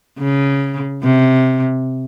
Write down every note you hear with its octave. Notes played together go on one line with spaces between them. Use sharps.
C#3
C3